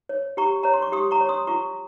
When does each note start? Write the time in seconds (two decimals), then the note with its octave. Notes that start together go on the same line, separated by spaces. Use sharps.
0.09 C#5
0.37 G4 A#5 C#6
0.63 C#5 A#5
0.74 C6
0.82 C#6
0.92 G4 C6 D#6
1.11 A#5 C#6
1.21 C#5
1.29 C6 D#6
1.47 F4 A#5 C#6